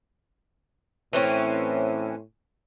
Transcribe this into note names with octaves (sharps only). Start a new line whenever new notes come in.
A2 E3 C4 C#4